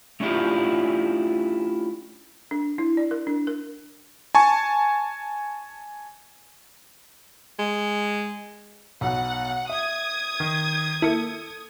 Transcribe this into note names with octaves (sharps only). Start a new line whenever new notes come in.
A3 C#4 D4 E4 F4 G4
D4
E4
D5
A#4
D4
A#4
G#5 A5 C#6
G#3
B1 B2 F#5
E5 D#6 G#6
D#3
A#3 E4 A4 C#7